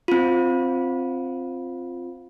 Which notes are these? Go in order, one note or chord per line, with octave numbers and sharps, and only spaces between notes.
C4 F4